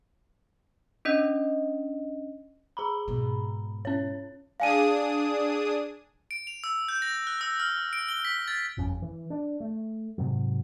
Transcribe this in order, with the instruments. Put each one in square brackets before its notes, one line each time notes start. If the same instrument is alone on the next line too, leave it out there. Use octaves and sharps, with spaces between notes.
[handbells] C#4 D4 D#5
[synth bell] G#4 A#5 B5
[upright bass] G#2 B2
[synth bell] C#4 C#5
[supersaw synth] D4 G#4 D#6 [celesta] F5 G#5 D#7
[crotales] D7
F7
E6
G6
A#6
F#6
E6
F6
D7
G7
B6
A6
[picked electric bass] G1 F2 C#4
E3
D4
A3
G#2 C3 F#3